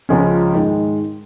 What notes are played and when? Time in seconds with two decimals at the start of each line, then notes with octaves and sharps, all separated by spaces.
0.09 C#2 C#3 F3 G#3 C#4
0.54 G#2 D#3 G#3